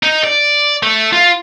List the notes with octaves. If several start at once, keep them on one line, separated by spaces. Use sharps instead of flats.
D#4
D5
A3
F4